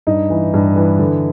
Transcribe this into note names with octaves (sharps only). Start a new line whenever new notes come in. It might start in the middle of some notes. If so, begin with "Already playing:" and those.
G2 D#4
E3
G2
E3
D3